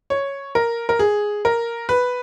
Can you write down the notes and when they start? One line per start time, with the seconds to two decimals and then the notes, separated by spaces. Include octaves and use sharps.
0.10 C#5
0.55 A#4
0.89 A#4
0.99 G#4
1.45 A#4
1.89 B4